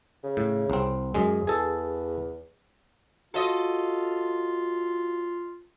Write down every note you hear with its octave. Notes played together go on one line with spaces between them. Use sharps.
C#3
A2
C2 C4
F#2 G#3 G#4
E2 G#4 A4
F4 F#4 A4 C#5 D#5 F5